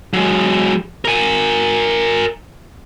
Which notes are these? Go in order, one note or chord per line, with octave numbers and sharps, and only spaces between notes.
F#3 G#3
A#4 G#5